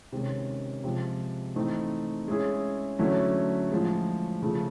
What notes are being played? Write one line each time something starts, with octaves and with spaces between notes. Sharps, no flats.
C3 D#3 G#3 C#4
C3 F3 G#3
A2 E3 A3 C4 D#4
G#3 C#4 E4 G#4
D3 F#3 A3 C#4 E4
A2 F3 G#3
C#3 F3 A3